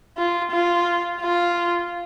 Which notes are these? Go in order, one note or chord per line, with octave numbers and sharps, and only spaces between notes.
F4
F4
F4